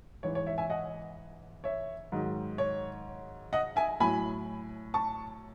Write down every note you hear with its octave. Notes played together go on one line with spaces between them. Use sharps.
G#2 E3 C#5
C#5
C#5 E5
E5 G#5
D#5 F#5
C#5 E5
G#2 D#3 F#3
C#5
D#5 F#5
E5 G#5
A2 F#3 G#5 B5
A5 C#6